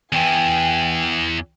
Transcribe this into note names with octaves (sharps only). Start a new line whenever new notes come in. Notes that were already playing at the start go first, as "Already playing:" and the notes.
E2 E3 G5 G#5